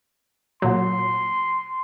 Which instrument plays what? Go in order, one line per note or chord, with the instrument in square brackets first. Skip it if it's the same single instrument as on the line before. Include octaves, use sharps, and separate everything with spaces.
[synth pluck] A#2 F#3 [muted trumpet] C6